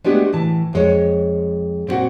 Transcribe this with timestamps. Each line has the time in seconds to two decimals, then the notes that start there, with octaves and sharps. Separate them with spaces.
0.04 G#3 A3 B3 D4 F#4 G4
0.33 A2 E3 A5
0.73 F2 G#3 C#5
1.87 A#2 C4 D4 F#4 F#5